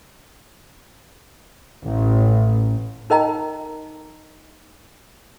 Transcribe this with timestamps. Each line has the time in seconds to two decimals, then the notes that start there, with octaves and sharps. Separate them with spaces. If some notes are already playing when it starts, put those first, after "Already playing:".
1.84 A1
3.10 D#4 A#4 D#5 G5 A#5